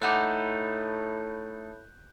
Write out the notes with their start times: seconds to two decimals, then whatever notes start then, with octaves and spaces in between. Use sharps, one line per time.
0.02 A2 A3 D#4 B4 F#5 D6 F#6 G6